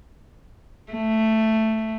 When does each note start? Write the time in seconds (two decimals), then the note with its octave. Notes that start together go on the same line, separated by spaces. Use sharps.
0.92 A3